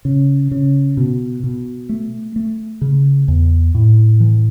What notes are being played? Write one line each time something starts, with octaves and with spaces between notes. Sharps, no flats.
C#3
C#3
B2
B2
A3
A3
C#3
E2
A2
E3